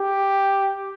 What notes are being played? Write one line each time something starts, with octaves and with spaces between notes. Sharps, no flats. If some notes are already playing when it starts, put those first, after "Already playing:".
Already playing: G4